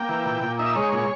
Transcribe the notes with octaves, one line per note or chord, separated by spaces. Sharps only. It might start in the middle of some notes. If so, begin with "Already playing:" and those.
Already playing: A#3 G5
E3
A#2
A#2
D#4 E5
G#3 C#5
A#2